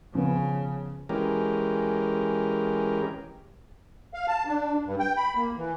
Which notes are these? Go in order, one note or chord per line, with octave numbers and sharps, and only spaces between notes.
C#3 F3 B3
E3 G#3 C#4 G4 A#4
F5
A5
D4
G2
G5
B5
A#3
E3